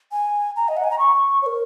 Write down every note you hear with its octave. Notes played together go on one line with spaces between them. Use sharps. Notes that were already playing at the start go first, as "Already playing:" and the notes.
G#5
A#5
D#5
F#5
G#5
A#5
C#6
C#5
A#4